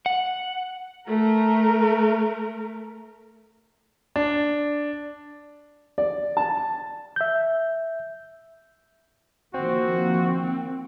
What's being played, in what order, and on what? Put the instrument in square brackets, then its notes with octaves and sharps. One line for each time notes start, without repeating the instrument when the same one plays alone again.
[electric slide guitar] F#5
[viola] A3 A#4
[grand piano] D4
[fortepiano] D5
A5
[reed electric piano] E5 G6
[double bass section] D#3 F3 A#3 [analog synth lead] C4 [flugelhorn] F#4